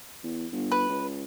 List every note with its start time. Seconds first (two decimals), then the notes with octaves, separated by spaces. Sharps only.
0.23 E2
0.52 G1
0.72 B4
0.89 C#2